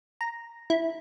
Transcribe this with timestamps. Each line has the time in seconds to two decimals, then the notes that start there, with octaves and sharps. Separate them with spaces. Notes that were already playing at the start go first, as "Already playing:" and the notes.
0.21 A#5
0.70 E4